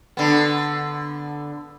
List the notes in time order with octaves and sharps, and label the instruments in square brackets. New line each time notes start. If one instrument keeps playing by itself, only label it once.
[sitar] D3 B3